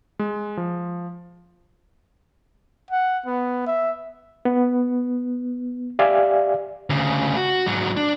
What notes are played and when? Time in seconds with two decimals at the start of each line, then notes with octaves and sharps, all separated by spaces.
0.19 G#3
0.57 F3
2.91 F#5
3.26 B3
3.67 E5
4.45 B3
5.99 G4 D5 E5 F5 G#5
6.90 D2 C#3
7.37 F#4
7.66 G#2 F#3
7.97 D4